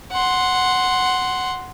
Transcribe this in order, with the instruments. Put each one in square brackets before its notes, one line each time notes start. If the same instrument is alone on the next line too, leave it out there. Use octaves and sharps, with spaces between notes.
[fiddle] F#5 C6